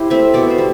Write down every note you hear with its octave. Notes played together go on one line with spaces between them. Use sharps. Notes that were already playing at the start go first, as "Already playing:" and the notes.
Already playing: E4 G4 C5
A3 C4 E5
B2 D5
C5
G3